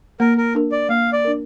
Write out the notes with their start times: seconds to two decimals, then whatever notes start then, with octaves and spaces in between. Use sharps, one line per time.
0.20 A#3 A#4
0.38 A#4
0.55 D4 A#4
0.72 D5
0.89 A#3 F5
1.13 D5
1.25 D4 A#4